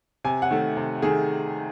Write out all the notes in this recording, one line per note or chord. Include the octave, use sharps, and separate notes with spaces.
C3 G#5
F#5
D#3 A3
C3
D#3 A3 G#4